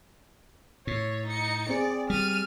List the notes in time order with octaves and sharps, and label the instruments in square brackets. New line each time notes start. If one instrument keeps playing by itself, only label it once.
[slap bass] A2 [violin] C#5
[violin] D#4 C#7
[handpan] C4 G#4 [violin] D5
[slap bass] G3 [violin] F6 D#7